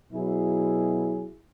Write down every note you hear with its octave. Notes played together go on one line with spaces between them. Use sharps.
B2 F#3 E4 G#4